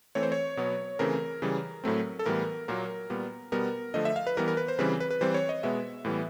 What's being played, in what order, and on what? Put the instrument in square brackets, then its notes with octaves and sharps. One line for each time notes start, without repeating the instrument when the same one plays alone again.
[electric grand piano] E3 A3 C4 C#5
C5
C#5
B2 F#3 B3
C#3 E3 A3 C4 A#4
C#3 E3 G3
A2 F#3 A3 C4
A4
A2 E3 G3 B3 A#4
A#2 F#3 A#3 A#4
A#2 G3 B3
B2 G3 B3 A#4
D3 F3 A3 D#5
E5
F5
B4
E3 G3 B3 A#4
A#4
B4
C5
C#3 E3 G3 C4 B4
B4
B4
E3 G3 C4 C5
C#5
D#5
B2 G#3 B3 E5
A2 E3 G3 B3